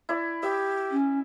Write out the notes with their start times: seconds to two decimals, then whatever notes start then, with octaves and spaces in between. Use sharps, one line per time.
0.09 E4 D5
0.43 G4 E5
0.91 C#4